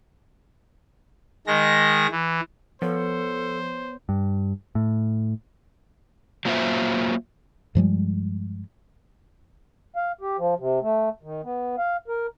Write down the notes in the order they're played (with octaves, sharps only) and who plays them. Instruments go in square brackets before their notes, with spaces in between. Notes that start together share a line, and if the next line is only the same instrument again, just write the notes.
[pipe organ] D#3 G#3 A#6
E3
[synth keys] F3 [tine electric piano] B3 C#5 [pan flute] A4 [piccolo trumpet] C5
[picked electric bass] G2
A2
[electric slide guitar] F#3 A#3 F4 C5 E5
[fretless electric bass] G2 F3 G3 G#3
[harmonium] F5
G4
F3
C3
A3
D#3
B3
F5
A#4